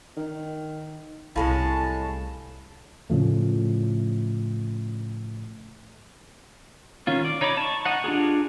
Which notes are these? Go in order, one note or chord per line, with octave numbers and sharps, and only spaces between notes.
D#3
C2 A2 G#3 C#4 E4 F5 A5 B5
A2 C#3 F3 A3
D#3 C#4 F4
D5
D#4 C#5 D#5 B5 D6
A5 C#6
D#4 D#5 F#5
D4 F4 G4 G#4